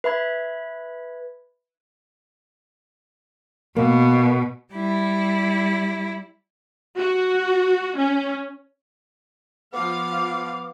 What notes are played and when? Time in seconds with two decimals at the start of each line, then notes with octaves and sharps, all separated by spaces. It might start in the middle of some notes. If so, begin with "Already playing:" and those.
0.04 B4 E5 B5 G#6
3.76 B2 A#3
4.73 G3 E4
6.97 F#4
7.97 C#4
9.73 F3 B3 F5 D6